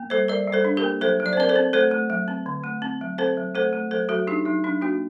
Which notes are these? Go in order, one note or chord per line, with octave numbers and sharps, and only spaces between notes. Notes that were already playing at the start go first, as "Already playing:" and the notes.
Already playing: A#3
G3 A4 C5
G3 A#4 D5
G3
A4 C5
D4
G4 A#4
A#3
F#3 A4 C5
F#3
D5
C5
C4 A#4 D5
A4 C5
C4
A3 A4 C5
A3
F#3
C4
D3
A3
C4
F#3
C4 A4 C5
F#3
A3 A4 C5
A3
F#3 A4 C5
F#3 F#4 A4
D4 D#4 G4
F#3 D#4
F#3 D4
A#3 D4 F#4